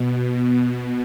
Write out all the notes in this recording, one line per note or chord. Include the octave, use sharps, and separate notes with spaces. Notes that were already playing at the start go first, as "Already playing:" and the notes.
Already playing: B2